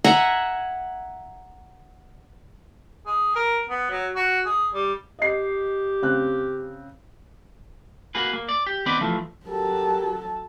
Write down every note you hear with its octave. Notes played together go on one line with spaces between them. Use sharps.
E5 F#5 G#5 A#5
G#4
A#4
B3
F#3
F#4
G#4
G3
G4 D#5 C7
C#3 C4 F#6
A#3 F#4 G#4 B4
A#3
D5
G4
D#3 B3 C4 B4 D5
E3 F3 A3
F#3 G4 A4 A#4